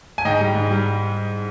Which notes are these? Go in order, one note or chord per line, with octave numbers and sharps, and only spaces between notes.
G#5
G#2 D#5 G5
G3
G#2
G3